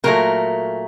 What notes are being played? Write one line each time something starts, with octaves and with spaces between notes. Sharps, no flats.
A#2 F#3 A3 A#4